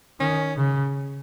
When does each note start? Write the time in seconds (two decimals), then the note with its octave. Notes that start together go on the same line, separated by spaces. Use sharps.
0.20 D#3 C#4
0.57 C#3